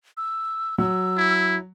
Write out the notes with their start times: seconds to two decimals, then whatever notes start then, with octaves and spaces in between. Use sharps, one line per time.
0.17 E6
0.78 F#3 E6
1.17 E4